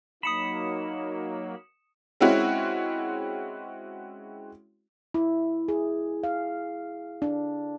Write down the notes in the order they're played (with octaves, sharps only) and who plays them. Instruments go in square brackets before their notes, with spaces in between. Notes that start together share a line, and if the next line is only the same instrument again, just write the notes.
[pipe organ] F#3 A#3 [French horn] D#4 [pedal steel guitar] B5 [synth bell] D#6 C#7 E7
[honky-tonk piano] G#3 C4 C#4 E4 F#4
[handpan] E4
G#4
F5
D4